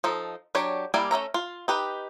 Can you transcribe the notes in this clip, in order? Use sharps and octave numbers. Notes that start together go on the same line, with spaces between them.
F3 D#4 A4
F#3 D4 G4 C#5
G3 A#3 E4 D5 G#5
A3 C#4 E5 A#5
F4
D#4 G4 B4